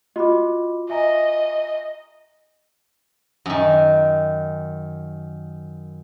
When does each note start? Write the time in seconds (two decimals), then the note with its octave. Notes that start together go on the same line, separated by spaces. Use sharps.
0.16 F4 F#4 D#5 B5 D6
0.90 D#5 E5 G#5 A#5
3.46 F#2 D#3